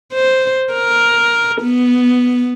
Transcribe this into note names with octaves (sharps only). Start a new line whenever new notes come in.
C5
A#4
B3